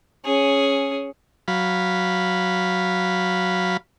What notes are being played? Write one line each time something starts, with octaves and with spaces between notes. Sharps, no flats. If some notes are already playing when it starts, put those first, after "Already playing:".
C#4 G#4
F#3 F5 B5